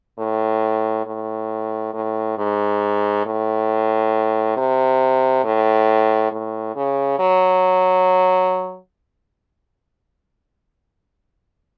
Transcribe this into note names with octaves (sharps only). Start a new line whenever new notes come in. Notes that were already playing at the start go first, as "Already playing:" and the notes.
A2
A2
A2
G#2
A2
C3
A2
A2
C#3
F#3